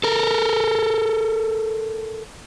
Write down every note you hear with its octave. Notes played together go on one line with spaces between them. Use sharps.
A4 A#4